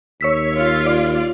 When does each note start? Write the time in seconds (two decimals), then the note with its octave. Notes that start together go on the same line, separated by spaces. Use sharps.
0.21 D#2 C#5 E6 B6
0.56 F4
0.86 D5